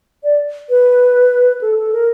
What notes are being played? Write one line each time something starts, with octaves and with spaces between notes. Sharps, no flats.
D5
B4
A4
A4
A#4